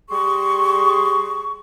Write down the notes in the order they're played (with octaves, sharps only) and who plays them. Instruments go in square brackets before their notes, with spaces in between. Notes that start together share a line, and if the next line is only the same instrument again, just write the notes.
[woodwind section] G3 G#4 C6 C#6